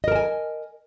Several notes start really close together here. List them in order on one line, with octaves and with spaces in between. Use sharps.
D#5 A#4 A5 G#5